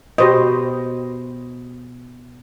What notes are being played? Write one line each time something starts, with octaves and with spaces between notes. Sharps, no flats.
B2 G4 C5 D#5